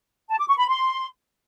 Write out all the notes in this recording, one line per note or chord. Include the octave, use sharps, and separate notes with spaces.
A5
D6
C#6
B5
C6